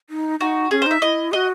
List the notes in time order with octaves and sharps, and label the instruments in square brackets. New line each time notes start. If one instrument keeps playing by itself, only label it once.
[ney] D#4
[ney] D#4 [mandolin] F#4
[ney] C#4 [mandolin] G#4
[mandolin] C5
[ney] D#4 [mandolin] E5
[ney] E4 [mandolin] D#5
[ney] F#4 G#4 [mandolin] D#5